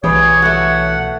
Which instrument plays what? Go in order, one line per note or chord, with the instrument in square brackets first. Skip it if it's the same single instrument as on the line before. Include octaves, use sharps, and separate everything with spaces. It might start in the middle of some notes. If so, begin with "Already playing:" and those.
[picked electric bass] B1 E3 [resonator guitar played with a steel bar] G3 [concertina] G#4 [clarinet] C#5
[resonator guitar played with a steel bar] A3 F#4 [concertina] F#5